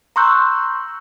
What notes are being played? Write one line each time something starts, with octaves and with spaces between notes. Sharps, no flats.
A#5 C6 C#6 E6 F#6 G6